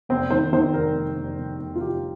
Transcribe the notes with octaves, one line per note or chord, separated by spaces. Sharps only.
F1 C4
D#3 C5
D#3 C5
F1 A#4
F1
F1
F1
F1
F4
F1 G4